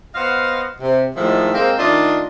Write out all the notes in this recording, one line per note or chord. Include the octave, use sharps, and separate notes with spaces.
B3 C5 D#5 F5 F#5
C3
A2 D#3 F3 G#3 E5
G#3 A#3 C4
D#3 A3 D4 F4 D#5